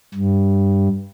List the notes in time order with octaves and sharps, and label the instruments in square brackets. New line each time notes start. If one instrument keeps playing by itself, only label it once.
[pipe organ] G2